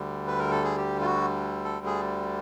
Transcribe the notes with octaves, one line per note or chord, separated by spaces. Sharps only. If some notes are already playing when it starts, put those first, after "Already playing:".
Already playing: D2 D3 G3
B4
A#4
A4
G#4
G4
F4
F#4
A4
G#4